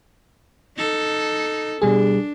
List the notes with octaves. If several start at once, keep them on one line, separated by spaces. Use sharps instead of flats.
D#4 A4
B2 G3 D4 G#4